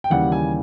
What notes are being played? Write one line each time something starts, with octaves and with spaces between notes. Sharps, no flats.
G5
D#2 C#3 E3 G3 F#5
G#5